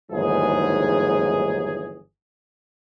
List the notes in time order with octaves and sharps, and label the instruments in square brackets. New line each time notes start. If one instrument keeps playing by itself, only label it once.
[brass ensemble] G1 D#2 G#2 E3 F#3 G#4